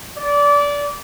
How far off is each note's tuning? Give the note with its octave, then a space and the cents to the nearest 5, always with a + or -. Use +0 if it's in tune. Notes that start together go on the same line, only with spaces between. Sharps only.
D5 -25